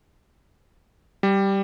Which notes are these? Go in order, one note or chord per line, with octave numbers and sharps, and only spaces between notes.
G3